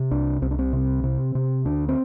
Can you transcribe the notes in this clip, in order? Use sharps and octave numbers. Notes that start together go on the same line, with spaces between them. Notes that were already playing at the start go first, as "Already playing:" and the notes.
Already playing: C3
C2 D4
C2 C4
D4
C4
C3
C3
C3
D2 D4
C4